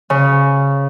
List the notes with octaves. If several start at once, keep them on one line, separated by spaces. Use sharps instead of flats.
C#3